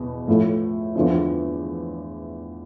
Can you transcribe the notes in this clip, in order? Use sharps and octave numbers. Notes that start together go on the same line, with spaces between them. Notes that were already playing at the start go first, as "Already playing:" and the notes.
Already playing: E2 B2
A2 F3 A3 E4
E2 D3 F3 C4 E4